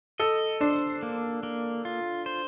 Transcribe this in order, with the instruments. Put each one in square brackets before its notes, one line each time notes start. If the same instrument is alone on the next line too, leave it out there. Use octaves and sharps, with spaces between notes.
[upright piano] A4 [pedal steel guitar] D#5
[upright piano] D4 [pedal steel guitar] C5
[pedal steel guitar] A#3
A#3
F4
C5